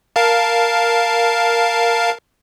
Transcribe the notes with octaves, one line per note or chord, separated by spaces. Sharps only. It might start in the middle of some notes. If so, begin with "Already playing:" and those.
A#4 F5 A5